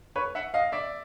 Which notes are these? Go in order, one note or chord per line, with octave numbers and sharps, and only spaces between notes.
B4 C#5
E5 F#5
D#5 F5
D5 E5